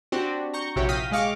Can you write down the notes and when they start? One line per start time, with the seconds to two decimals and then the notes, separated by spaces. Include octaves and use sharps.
0.12 C4 D4 F#4 G4
0.54 A#5 C#6 G6
0.76 A#1 C3 E4 F#4 G4 C#5
0.89 F5 G5 D#6 F6 A#6 B6
1.11 G#3 D#5 F5 C#6 D6